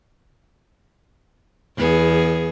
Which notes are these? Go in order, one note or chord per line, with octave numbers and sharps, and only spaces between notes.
E2 B3 G#4